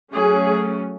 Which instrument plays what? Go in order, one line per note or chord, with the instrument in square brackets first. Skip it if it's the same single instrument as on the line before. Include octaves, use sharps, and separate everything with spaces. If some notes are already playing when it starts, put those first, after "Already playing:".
[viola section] F#3 A3 C#4 G#4